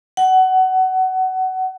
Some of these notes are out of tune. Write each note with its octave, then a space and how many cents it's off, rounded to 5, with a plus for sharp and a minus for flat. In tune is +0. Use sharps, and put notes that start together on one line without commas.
F#5 +20